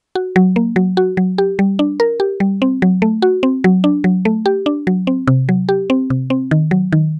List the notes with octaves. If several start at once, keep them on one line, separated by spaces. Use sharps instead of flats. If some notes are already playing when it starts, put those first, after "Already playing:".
F#4
F#3
A#3
F#3
F#4
F#3
G4
G3
D4
A#4
G4
G3
C4
F#3
A3
F#4
C4
F#3
D4
F#3
A3
G4
D4
F#3
C4
C3
F#3
G4
C4
C3
C4
D#3
F#3
D#3